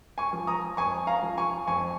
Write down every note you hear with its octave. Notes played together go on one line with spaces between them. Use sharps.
G#5 C#6
F3
A#5 D#6
F2 G#5 C#6
F5 A#5
F3
G#5 C#6
F2 G#5 C#6